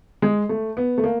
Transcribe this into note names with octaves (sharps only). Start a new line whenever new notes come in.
G#3
A3
B3
A3
A#3